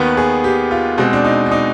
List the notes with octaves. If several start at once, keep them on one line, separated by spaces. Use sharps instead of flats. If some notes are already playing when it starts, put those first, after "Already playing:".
Already playing: D#2 D#3 B3 B4
G#4
G4
F4
B2 G#3 C4
D4
D#4
D4
D#4